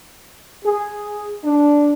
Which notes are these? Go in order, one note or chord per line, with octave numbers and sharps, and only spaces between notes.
G#4
D4